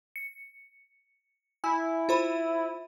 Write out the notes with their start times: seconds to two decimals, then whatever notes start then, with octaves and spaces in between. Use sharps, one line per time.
0.16 C#7
1.64 E4 G#5
2.09 F4 C5 B5